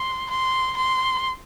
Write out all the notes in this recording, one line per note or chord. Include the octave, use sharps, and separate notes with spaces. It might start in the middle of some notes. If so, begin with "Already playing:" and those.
Already playing: C6
C6
C6